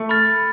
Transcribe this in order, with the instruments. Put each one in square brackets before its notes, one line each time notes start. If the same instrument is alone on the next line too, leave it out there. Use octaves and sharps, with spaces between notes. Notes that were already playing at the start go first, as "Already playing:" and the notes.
Already playing: [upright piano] A3
[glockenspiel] B5 F6 A6